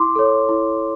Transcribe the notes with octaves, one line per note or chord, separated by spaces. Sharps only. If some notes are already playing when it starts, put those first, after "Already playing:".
Already playing: E4 C6 D6
A4 C#5
E4